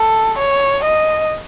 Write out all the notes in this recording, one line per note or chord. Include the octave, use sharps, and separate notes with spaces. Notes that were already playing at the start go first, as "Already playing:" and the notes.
Already playing: A4
C#5
D#5